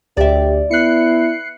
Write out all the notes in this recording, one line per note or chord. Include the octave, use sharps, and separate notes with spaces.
D2 G4 D5 E5
B3 E4 F#6 C7 C#7